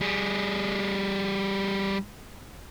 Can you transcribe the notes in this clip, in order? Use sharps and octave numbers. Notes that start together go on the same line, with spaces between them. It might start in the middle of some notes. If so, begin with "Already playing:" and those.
G3 G#4